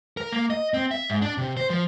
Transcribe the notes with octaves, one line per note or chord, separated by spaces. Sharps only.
A#4
A#3
D#5
C4
E5
G#2
D4
C3
C5
F3